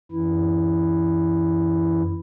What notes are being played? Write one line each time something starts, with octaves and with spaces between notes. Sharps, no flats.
F#2 E3 E4